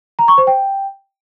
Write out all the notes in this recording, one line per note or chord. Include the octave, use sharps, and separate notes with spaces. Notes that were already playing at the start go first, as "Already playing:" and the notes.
A#5
C#6
C5
G5